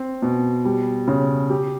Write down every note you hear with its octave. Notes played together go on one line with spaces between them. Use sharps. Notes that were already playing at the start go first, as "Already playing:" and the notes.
Already playing: C4
B2
G3
C#3
G4